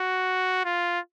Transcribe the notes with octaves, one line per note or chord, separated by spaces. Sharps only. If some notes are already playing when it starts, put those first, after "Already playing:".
Already playing: F#4
F4